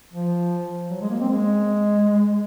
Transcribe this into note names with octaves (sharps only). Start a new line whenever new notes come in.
F3
F#3
G#3
A#3
C4
G#3